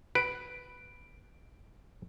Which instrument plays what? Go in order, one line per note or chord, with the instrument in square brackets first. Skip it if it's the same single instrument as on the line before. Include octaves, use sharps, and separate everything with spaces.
[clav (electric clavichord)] B4 [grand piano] D7